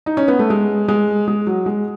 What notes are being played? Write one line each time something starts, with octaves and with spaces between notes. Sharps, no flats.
D#4
C#4
B3
A3
G#3
G#3
G#3
F#3
G#3